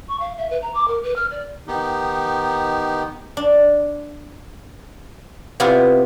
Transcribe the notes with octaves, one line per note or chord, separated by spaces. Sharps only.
C#6
F5
E5
B4
A#5
D6
A#4
B4
F6
D5
D#3 B3 D#4 G4
D4
C3 B3 E4 F4 G4